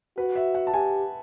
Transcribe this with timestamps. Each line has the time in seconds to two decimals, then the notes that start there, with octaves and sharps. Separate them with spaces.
0.17 F#4 B4
0.36 E5
0.55 F#5
0.67 A5
0.74 G4 G#5